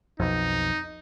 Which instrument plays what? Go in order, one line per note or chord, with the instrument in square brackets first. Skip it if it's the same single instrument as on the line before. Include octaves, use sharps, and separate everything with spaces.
[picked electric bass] B1 F2 [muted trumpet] D#4